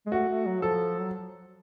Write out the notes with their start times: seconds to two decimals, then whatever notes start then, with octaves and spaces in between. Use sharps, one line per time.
0.06 G#3
0.12 A3 F#4
0.29 A3
0.46 F#3
0.62 F3 A4
1.01 F#3